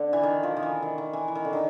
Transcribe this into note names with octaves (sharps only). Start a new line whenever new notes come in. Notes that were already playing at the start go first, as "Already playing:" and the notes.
Already playing: D3
E3
D#3
F3
D#3
E3
D#3
D#3
E3
E3
D#3
D3
D#3